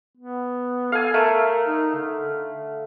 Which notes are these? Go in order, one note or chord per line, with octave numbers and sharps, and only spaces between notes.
B3
A4 F5 G#5
A3 A#4
D#4
D3